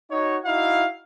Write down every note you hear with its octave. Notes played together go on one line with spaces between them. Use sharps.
D#4 F#4 C#5
D#4 E4 F#4 F5